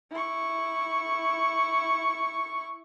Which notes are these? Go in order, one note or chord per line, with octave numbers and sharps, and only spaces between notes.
E4 C#6